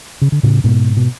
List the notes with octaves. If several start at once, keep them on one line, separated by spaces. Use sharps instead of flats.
C#3
D3
A2 C#3
G#2 B2
B2